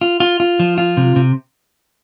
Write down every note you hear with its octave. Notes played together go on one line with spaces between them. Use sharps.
F4
F4
F4
F3
F4
C3
C3